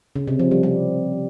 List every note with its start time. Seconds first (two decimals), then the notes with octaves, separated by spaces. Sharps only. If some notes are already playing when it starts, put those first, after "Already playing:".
0.16 C#3
0.27 C3
0.39 F3
0.51 G3
0.63 G3